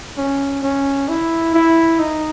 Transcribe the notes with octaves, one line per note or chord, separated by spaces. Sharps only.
C#4
C#4
E4
E4
D#4